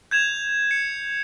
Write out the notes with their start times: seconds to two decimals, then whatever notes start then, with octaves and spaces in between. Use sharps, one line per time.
0.11 G6 G#6 E7 F7
0.71 C#7